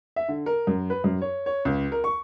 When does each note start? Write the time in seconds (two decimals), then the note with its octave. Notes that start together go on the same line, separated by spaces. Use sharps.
0.16 E5
0.28 D3
0.46 A#4
0.67 F#2
0.90 B4
1.04 F#2
1.21 C#5
1.46 C#5
1.65 C#2
1.92 A#4
2.04 C#6